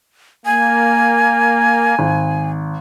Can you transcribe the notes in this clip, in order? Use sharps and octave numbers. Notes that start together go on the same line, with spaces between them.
A#3 G#5
G#1